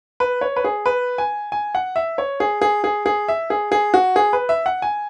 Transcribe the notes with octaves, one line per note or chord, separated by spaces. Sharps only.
B4
C#5
B4
G#4
B4
G#5
G#5
F#5
E5
C#5
G#4
G#4
G#4
G#4
E5
G#4
G#4
F#4
G#4
B4
E5
F#5
G#5